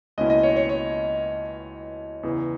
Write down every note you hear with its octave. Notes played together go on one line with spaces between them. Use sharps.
C#2 B2 A#3 C#4 E4 D#5
D#5
C#5
C#5
C#5
E2 C#3 E3